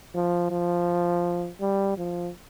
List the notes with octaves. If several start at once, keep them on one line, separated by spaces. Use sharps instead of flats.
F3
F3
G3
F3